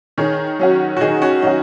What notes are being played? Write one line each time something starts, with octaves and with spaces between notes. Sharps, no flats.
D#3 G#4 C#5
F#3 C#4 F#4
F#4
D#3 D#4 G#4
C#4 F#4
F#3 C#4 D#4 F#4